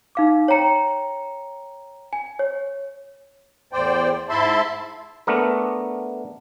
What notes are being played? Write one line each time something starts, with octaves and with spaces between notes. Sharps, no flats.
D#4 F5 D6
C#5 G5 A#5 C#7
G#5
C#5
E2 A2 C5 D5 G5
G#2 E4 E5 A5 B5 C6
A3 B3 D4 A#4